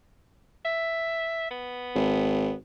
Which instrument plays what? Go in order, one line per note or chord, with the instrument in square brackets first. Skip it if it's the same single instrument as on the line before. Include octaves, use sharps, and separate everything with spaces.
[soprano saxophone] E5
B3
[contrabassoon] G#1